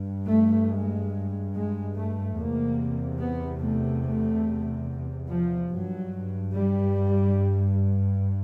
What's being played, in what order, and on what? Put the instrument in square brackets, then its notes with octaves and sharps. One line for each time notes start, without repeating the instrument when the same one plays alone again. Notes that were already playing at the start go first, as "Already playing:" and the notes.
Already playing: [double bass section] G2
A3
G#3
G#3
A3
E2 C3 A#3
B3
A3
A3
F3
G2 F#3
G3